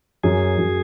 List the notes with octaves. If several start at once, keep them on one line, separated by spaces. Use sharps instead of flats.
F#2 G#4
F#2